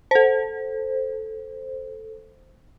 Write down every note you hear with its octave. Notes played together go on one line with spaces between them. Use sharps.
A4 C5